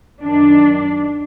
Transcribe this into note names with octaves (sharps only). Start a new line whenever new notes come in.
F#2 D#3 D4